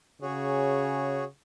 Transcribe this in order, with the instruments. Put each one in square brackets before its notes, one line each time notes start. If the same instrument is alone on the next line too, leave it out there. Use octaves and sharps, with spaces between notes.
[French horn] C#3 [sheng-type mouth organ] F#4 G#4 C#5